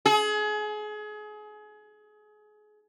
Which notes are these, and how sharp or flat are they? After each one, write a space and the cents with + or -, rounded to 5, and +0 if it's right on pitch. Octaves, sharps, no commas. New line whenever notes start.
G#4 +30